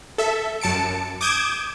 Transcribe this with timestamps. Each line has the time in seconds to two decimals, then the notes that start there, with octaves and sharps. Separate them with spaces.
0.18 A4 E5
0.61 F#2 A5 C#7 D7
1.21 D6 D#6 G6 G#6 D7 E7